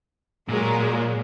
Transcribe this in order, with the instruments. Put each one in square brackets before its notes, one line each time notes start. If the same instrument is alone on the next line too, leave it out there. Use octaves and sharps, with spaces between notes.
[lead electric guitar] A#2 [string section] F#3 G#3 A#4